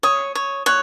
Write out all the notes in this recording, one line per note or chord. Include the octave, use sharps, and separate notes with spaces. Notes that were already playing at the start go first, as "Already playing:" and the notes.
C#5 D#6
C#5
C#5 F#6